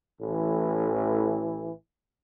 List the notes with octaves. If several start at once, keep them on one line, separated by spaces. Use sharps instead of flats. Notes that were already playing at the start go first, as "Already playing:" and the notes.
A1 A2 E3